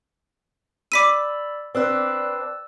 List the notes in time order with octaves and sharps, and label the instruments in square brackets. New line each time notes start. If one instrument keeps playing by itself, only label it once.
[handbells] D5 B5 E6 [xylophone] D6 B6 D#7
[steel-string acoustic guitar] C4 D4 B4 [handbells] D5 E6 F#6